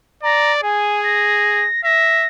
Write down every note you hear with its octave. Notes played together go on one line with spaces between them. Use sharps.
D5 A#5
G#4 G#5
A#6
E5 A#6